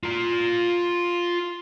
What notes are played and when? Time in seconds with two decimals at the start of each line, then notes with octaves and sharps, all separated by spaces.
0.03 F4 A#5